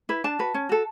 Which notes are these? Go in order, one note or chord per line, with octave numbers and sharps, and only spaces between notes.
E4 B4
D4 A5
F#4 B4
C#4
F#4 A4